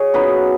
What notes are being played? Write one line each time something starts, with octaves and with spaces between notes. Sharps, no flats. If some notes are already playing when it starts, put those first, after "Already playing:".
Already playing: G#4 C#5 D#5
C#3 B3 D#4 F#4 B4